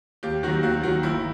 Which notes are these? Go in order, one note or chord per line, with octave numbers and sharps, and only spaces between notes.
D#2 G4
D#3 F#3 F#4
D#2 F#4
D#3 F#3 F#4
G1 E4